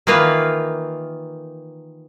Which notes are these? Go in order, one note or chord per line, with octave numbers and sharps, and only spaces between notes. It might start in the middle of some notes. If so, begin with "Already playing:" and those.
D#3 E3 A#3 F4 B4